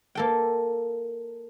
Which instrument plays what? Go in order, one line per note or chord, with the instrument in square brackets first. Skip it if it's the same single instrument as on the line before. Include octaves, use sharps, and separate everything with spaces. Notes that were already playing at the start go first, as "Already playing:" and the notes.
[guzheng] A#3 A4 G5